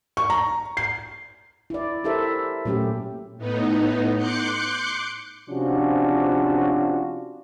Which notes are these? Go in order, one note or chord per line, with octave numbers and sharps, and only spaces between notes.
C#6
A#5
C7
E4 D5
E4 G4 A4 A#4 C5 E5
A#2 F#3 A3 C#4 G4
A2 B3 D#4
C6 D6 F#6 G6 C#7
C3 F3 C#4 D4 F4 F#4